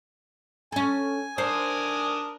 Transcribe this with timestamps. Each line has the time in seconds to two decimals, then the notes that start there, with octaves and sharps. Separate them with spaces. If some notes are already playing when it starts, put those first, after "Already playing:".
0.72 C#4 A4 G#5
1.38 D4 A#4 C5 D#6